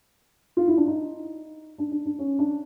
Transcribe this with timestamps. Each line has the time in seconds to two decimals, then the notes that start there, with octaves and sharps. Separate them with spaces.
0.57 F4
0.68 E4
0.77 D4
0.87 D#4
1.78 D4
1.91 D4
2.05 D4
2.19 C#4
2.39 D4